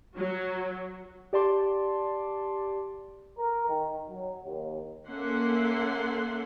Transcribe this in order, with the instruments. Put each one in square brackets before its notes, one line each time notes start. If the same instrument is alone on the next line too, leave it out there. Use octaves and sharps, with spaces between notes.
[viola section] F#3
[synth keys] G4 D5 A5 C6 D6
[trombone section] A#4
D#3
F#3
D#2
[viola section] A#3 C#4 A4 E5 F#5 C6